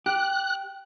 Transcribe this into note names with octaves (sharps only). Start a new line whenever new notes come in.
G4 F#6